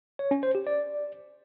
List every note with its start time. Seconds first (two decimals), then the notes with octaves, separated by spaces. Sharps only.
0.19 C#5
0.31 C#4
0.43 C5
0.55 G4
0.67 D5